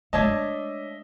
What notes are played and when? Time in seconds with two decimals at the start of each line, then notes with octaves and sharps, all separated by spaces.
0.13 G#3 A3 D4 C#5 D#5 E5 A5